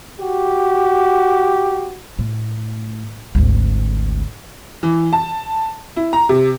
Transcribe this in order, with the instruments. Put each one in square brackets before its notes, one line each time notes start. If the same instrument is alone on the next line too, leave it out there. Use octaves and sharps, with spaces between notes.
[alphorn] F#4 [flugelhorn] G4
[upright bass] A2
G#1 D2
[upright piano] E3
A5
E4
A#5
C3